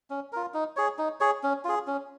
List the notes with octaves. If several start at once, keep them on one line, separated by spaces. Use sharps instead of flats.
C#4
F4 A#4
D#4
G#4 C#5
D#4
G#4 C#5
C#4
F4 G#4
C#4